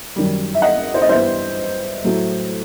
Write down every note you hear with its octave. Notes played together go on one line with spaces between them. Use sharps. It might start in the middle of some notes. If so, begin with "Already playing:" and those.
F#2 D#3 G3
E5
D#5 F#5
C5
D#5
G2 E3 G3 B3 C5 E5
A2 F#3 A3